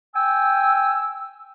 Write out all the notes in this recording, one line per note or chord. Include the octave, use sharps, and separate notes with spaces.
G5 G#5 E6